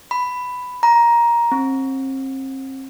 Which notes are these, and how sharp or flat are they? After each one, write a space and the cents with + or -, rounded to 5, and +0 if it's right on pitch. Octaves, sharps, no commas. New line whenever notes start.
B5 +10
A#5 +15
C4 +35